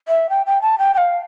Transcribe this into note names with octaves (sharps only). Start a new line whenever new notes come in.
E5
G5
G5
A5
G5
G5
F5